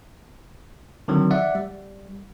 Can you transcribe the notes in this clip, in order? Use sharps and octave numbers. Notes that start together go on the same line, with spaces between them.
D3 D#3 F#3 C4
D5 E5 F#5
G3